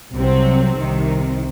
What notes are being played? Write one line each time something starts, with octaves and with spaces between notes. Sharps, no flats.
C2 C3 F#3 C4
C2 C3 D#3